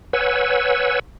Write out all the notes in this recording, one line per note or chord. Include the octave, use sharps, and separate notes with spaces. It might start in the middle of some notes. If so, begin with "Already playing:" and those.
B4 C#5 F#5 G#5 E6